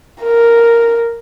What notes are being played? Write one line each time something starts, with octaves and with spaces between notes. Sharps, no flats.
A#4